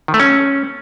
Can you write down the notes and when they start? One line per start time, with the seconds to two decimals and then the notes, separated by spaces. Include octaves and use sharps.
0.08 D#3
0.14 A3
0.20 C#4